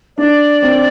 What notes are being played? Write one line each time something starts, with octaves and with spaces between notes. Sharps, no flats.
D4 D5
C4